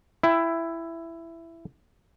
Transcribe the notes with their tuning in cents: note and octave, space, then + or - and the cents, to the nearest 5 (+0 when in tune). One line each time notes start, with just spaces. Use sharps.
E4 +10 E5 +5 G5 +0